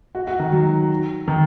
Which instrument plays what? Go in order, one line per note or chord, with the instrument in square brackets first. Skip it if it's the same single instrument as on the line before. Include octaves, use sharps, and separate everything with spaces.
[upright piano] F#4
F#4
D#3
F#3
D#3